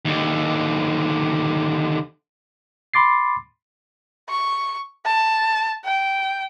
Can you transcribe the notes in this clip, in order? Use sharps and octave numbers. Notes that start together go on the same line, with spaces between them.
D#2 D3
B5 C6 D6 A6 C7
C#6
A5
G5